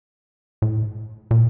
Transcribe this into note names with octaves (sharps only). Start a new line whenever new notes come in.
A2
A#2